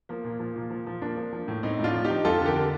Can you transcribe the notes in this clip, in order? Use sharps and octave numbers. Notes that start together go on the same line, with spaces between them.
F3 A#3
A#2
F3
A#2
F3
F3
F3 A#3 D4
F3
F3
A2
A2 C4 D#4
A2
D4 F4
F3
D#4 G4
F3
F2 F4 A4
D3
G4 A#4
D3